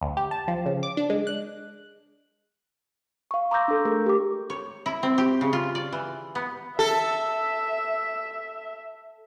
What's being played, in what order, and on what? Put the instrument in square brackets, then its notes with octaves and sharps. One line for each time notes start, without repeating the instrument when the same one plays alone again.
[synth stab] D2
G4
A5
F3
C#3
D6
D4
G#3
F#6
[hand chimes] F5 C#6
A#5 C6 D6 E6 G6 A#6
D4 A4
A3 G#4 A#4
G4 D6
[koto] C#5
E4
C4
G4
C#3
F4
D5
E3
B3
[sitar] A4 [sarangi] E5